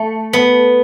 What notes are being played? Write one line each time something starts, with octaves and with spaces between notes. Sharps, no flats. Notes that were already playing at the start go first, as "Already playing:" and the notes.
Already playing: A3
B3